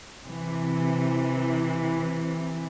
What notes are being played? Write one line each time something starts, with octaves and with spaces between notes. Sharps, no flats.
C3 E3